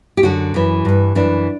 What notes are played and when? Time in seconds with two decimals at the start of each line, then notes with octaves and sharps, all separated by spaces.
0.17 G4
0.23 F#2 D3 F#4
0.54 F#2 E3
0.85 G2 E3
1.15 F#2 E3 D4